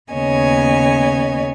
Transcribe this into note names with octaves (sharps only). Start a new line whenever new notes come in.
D#2 C#3 B3 C#5 D#5 G#5